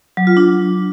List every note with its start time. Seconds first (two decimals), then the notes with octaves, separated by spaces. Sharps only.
0.17 F#3
0.27 F4
0.37 D4